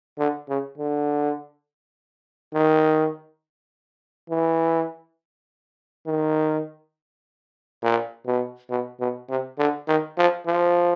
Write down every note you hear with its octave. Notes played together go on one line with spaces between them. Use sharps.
D3
C#3
D3
D#3
E3
D#3
A#2
B2
B2
B2
C3
D3
D#3
F3
F3